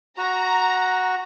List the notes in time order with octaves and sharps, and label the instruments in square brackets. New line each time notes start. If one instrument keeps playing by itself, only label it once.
[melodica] F#4 [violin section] A#5